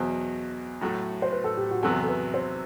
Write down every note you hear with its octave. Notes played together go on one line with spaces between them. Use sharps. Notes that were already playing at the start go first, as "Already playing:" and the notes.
Already playing: E2 B2 F#3 C5
A2 F#3 A3
C5
B4
A4
G4
F#4
E2 C3 F#3 B3 A4
A4
B4
C5